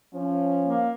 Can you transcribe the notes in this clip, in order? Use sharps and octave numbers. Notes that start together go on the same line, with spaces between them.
F3 C#4
A#3